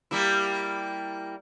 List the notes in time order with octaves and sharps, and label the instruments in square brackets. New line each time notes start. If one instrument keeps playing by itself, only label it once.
[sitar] G3 A#3 E4